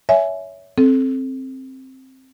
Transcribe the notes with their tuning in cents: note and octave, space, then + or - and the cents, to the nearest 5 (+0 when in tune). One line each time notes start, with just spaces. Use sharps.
C#5 +25 E5 +0 G#5 +5
C4 +10 A4 -15